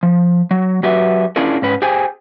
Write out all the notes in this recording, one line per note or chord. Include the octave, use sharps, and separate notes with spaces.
F3
F#3
F#3 F#4 G4 B4 E5
C#4 D4 E4 F4 G#4 A#4
G#2 C#4 B4
G4 G#4 C5 G#5